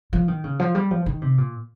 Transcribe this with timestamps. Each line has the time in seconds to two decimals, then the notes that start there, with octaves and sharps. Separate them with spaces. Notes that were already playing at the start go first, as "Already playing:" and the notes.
0.13 F3
0.28 D#3
0.44 C#3
0.60 F3
0.75 G3
0.91 F3
1.06 D#3
1.22 C3
1.38 A#2